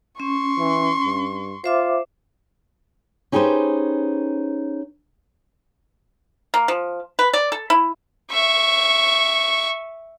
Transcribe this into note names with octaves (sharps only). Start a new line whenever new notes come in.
C#4 C6 C#6
E3
G2
F4 C5 E5 D6
C#4 D#4 G4 G#4 B4 C5
A#3
F3
B4
D5
A4
E4
E5 C#6